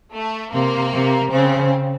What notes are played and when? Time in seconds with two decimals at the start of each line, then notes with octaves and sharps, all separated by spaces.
0.13 A3
0.53 C3 A#3
0.93 C3
1.32 C#3 C4